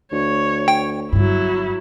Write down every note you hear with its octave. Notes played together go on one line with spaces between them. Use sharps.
D2 C#5
G5
G1 G2 F#3 E4